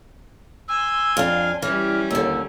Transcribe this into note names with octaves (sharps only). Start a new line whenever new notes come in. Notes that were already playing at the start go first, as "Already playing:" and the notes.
G#5 C6 E6
F2 D4 F5
E3 G3 C#4 F6
D#2 D3 E6